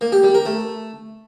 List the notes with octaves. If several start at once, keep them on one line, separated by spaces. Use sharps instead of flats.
A#3
G4
G3
A#4
A3